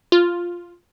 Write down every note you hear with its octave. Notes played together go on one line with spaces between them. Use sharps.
F4